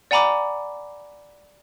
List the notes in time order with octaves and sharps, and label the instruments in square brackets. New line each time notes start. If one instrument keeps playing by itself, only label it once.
[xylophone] D5 F#5 G#5 A#5 B5 D6